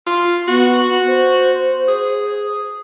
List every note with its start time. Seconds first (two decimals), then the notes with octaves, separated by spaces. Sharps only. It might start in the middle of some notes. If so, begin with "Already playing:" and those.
0.07 F4
0.48 B3 F#4
1.07 C5
1.88 G#4